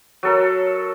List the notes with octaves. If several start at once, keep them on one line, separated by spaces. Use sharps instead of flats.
F#3 A4 A#4